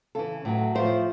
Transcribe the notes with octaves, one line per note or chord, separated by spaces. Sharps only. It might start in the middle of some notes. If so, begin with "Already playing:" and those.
C#3 E3 A4
A2 F#3
A2 F3 C5